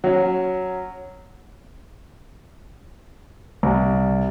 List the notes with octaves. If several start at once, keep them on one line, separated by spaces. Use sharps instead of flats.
F#3 C#4
C2